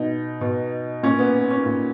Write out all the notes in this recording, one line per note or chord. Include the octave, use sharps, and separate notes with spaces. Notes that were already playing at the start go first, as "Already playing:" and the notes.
Already playing: B2 D#4
B2
A#2 C#4
B3
B3
C#4
A#2